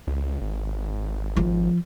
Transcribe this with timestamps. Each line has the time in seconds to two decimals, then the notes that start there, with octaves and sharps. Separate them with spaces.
0.07 C#2
0.41 G#1
1.37 F3